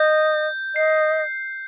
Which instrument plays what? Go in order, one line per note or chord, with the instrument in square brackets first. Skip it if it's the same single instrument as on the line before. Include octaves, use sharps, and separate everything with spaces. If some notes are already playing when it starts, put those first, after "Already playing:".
Already playing: [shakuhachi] D#5 [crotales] G6
[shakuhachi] D#5 [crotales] C7